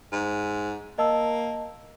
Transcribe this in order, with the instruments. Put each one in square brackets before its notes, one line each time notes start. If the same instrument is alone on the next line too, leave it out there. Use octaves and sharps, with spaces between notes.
[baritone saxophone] G#2
[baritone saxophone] A#3 [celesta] D#5 A5 E6